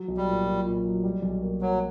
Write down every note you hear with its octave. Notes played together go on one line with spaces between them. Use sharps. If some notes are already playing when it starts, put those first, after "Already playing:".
Already playing: F#3
B1
G3
A#2
A#2
A#2
F#3
G3
B1
A#3
F#3 A#3